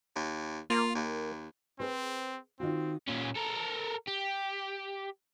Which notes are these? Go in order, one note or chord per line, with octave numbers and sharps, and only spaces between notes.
D#2
A#3 F4
D#2
C4 G#4 B4 C5
D#3 C4 F4 F#4
A#2 C#4
A4 A#4
G4